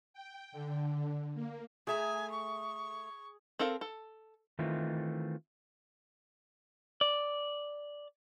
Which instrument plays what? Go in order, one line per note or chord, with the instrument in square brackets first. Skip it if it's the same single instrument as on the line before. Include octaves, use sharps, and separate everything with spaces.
[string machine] G5
D3
A#3
[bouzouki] A3 E5 A#5 [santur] G#4 [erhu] G#5
[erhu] C#6
[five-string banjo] C4 A4 A#4 F5
A4
[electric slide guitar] D#3 E3 A3 C4 F4
[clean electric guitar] D5